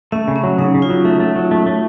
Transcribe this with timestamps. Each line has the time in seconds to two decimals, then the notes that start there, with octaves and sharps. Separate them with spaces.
0.12 A3 C#4
0.28 C#3
0.36 C#4
0.43 F#3
0.58 C#3 D#4
0.74 C#3
0.82 F4
0.90 F#3
1.05 A3
1.20 A3
1.36 F#3
1.51 A3
1.66 A3